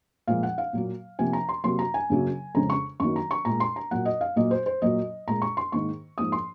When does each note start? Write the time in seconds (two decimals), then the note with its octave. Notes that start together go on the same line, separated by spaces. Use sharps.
0.27 A#2 F3 G#3 F5
0.43 F#5
0.58 F5
0.73 A#2 F#3 A#3
1.19 C3 F3 A#3 G#5
1.33 A#5
1.49 C6
1.64 C3 F#3 A#3 C6
1.79 A#5
1.94 G#5
2.10 F#2 C#3 F#3 A#3
2.55 F2 C#3 G#3 A#5
2.70 C#6
3.00 F#2 D#3 F#3 A#3 C#6
3.16 A#5
3.31 C#6
3.45 A#2 G#3 A#5
3.60 C6
3.76 A#5
3.91 A#2 F#3 A#3 F#5
4.05 D#5
4.21 F5
4.36 A#2 F#3 A#3 D#5
4.51 C5
4.66 C5
4.82 A#2 F#3 A#3 D#5
5.28 A#2 G#3 A#5
5.42 C#6
5.57 C6
5.72 G#2 D#3 A#3 C#6
6.18 G#2 F3 A#3 D#6
6.32 C6